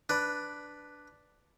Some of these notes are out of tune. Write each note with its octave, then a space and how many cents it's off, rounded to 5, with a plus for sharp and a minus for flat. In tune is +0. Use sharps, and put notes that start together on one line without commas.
D4 +0 B4 +0